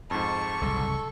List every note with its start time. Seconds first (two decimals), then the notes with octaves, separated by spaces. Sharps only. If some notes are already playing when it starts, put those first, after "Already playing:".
0.11 F2 G#2 A5 C#6
0.61 F#1 C2 A#2 A4